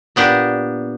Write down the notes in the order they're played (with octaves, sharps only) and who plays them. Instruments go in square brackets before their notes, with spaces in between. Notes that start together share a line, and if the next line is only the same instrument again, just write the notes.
[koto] A#2 B3 D4 G4